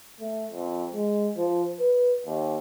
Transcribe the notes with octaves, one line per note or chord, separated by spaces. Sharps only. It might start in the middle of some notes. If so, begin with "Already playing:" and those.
A3
F2
G#3
F3
B4
D#2